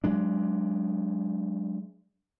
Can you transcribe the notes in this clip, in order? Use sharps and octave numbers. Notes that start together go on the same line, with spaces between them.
F#3 G#3 D4